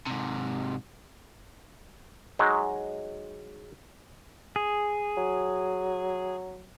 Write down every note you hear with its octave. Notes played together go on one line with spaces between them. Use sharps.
G#2 C3
F#3 G#3 D#4
G#4
F#3